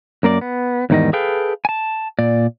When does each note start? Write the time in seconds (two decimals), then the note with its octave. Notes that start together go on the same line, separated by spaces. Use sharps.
0.23 F#2 A#3 A#4 D5
0.41 B3
0.90 E2 G#2 D#3 G3 D#5
1.13 G#4 A4 B4 F5 G5
1.65 G#5 A5
2.19 A#2 D5